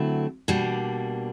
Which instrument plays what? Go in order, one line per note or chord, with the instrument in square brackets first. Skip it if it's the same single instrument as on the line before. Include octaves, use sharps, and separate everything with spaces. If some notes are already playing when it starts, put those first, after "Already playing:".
Already playing: [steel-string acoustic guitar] D3 F#3 A3 C4 E4
B2 G3 A#3 D4